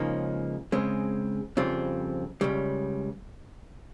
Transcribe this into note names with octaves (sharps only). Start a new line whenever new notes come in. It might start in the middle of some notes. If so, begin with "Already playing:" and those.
Already playing: C#2 C#3 F3 A#3 D#4
C#3 G#3 C4
F2 C#3 G3 C4 F4
C#2 C#3 G3